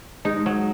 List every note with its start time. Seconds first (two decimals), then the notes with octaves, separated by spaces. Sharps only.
0.25 G#3 D#4
0.46 F#3